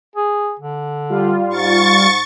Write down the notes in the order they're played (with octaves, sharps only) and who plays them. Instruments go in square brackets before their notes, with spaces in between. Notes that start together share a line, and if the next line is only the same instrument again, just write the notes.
[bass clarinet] G#4
D3
[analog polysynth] G3 F4
[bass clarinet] G#2 [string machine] C#6 A6